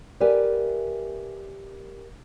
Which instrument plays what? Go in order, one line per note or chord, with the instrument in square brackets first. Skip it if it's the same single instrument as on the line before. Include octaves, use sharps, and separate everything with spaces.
[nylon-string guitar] G4 A#4 B4 D5 E5 G#5